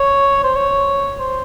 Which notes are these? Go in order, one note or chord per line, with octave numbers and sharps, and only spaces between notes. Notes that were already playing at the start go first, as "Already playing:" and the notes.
Already playing: C#5
C5
C#5
C5